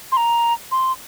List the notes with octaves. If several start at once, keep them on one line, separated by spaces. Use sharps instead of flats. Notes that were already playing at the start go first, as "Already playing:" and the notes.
C6
A#5
C6